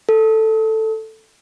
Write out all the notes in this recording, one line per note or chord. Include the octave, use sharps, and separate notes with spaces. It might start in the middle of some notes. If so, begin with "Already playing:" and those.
A4